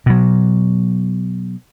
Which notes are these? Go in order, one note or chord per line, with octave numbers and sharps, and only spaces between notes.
B2 F#3